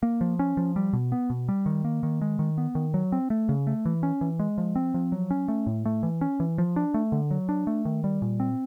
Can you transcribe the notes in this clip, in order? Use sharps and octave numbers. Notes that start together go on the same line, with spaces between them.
A#3
F3
C#4
F3
G3
B2
B3
B2
G3
D#3
A#3
D#3
G#3
D#3
B3
D#3
F#3
C4
A3
C#3
A3
E3
C#4
E3
G#3
F3
C4
F3
F#3
C#4
A3
A2
A3
E3
C#4
E3
F3
D4
A3
D3
F#3
D4
A3
D#3
G3
A#2
C4